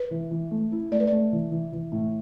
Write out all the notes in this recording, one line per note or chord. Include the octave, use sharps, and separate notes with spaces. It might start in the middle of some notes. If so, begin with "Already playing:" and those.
Already playing: B4
E3
E3
A3
E4
A3 D5
B4
A3 D5
E3
E3
E3
A2